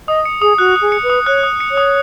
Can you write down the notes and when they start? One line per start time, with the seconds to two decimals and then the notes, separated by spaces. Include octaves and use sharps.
0.08 D#5 D#6
0.25 C#7
0.41 G#4 D#6
0.58 F#4 F#6
0.76 D#6
0.82 G#4
0.92 C#7
1.03 B4
1.10 D#6
1.26 C#5 F#6
1.43 D#6
1.60 C#7
1.71 C#5
1.78 D#6